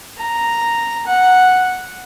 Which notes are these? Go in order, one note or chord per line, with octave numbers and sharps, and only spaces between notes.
A#5
F#5